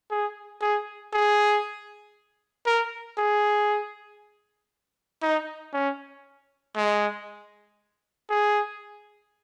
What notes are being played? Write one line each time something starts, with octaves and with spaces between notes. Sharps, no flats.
G#4
G#4
G#4
A#4
G#4
D#4
C#4
G#3
G#4